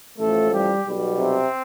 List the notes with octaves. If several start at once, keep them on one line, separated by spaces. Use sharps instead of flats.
A1 A2 F3 A3 A4
G3 G4
B1 B2 G3
C3 C4